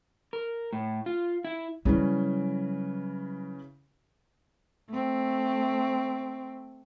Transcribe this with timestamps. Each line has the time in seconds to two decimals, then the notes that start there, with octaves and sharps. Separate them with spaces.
0.33 A#4
0.73 A2
1.06 F4
1.45 E4
1.85 C#3 E3 F#3 G3 C#4
4.90 A3 C4